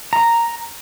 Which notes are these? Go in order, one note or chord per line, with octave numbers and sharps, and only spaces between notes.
A#5